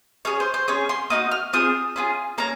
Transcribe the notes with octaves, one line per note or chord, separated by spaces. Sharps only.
C#4 G#4 C#5
C5
C5
C#4 G#4 C#5
C6
A#3 D#4 F#4 D#6
F6
C4 F4 G#4 D#6
C#4 F4 G#4
A#3 C#4 A#5